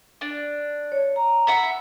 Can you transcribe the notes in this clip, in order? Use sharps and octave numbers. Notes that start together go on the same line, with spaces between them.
D4
C#5
A#5
E5 F#5 B5